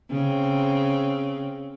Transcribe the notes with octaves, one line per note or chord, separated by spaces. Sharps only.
C#3 C4